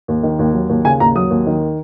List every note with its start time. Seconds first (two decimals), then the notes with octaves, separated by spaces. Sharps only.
0.08 D#2
0.23 D#3
0.39 D#2
0.54 F#3
0.69 D#2
0.85 C#3 G#5
1.00 D#2 A#5
1.15 F#3 D#6
1.30 D#2
1.46 D#3